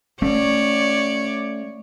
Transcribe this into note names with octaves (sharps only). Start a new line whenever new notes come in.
A3 C#4 C#5 D5